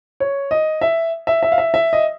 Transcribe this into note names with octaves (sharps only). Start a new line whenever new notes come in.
C#5
D#5
E5
E5
E5
F5
E5
E5
D#5